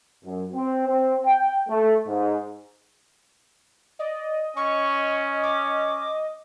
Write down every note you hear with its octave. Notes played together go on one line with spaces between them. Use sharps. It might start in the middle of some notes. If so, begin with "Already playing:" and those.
F#2
C4
C4
G5
A3
G#2
D5 D#5
C#4 C#6
D6